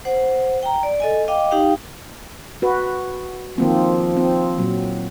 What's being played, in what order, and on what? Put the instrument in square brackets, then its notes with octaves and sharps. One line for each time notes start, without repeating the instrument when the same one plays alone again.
[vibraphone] C5 F#5
G5 A#5
D5
A4 D#5 G#5
D#5 F5 G5 D6
D#4 G4 F5 G5
[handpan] F#4 B4
[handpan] D#3 A#3 C4 [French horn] F3
[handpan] C4
A#2 F#3